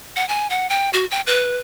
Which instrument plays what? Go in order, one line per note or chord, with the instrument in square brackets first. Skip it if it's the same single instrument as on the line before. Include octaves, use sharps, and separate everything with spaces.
[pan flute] F#5
G#5
F#5
G5
F#4
G5
B4